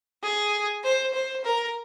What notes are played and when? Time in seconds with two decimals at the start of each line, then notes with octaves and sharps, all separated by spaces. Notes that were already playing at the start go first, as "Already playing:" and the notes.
0.22 G#4
0.83 C5
1.14 C5
1.45 A#4